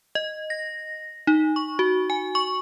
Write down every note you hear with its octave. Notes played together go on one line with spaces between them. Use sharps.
D#5
A#6
D#4
C#6
F#4
G#5
C#6